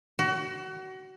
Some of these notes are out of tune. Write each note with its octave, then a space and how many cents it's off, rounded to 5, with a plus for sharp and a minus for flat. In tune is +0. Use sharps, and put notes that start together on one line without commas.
F#4 +30